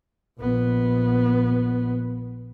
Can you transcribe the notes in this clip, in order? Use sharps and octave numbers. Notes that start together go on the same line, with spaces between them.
A#1 B3